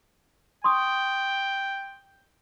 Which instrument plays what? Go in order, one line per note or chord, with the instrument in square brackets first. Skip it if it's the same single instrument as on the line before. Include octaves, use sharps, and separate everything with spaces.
[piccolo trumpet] G5 [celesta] C6 C#6 D#6